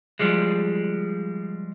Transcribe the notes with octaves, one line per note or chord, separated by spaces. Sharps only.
F3 G3 G#3